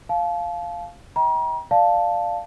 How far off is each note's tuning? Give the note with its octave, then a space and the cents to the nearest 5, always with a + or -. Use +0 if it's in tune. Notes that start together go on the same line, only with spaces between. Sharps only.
F5 +0 A5 -35
D#5 +40 G5 +0 A#5 +40
D5 +10 F5 +0 A5 +0